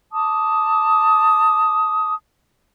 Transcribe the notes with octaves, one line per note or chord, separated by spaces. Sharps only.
A5 D6 D#6